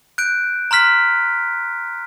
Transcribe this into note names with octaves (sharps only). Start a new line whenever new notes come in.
F#6 G6 D7
A#5 C6 F6 B6